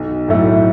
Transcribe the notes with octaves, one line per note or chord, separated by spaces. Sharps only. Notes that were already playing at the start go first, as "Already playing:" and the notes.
Already playing: B1
A2 F#3 A3 E4